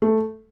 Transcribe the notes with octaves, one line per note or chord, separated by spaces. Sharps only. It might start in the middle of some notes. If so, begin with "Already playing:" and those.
A3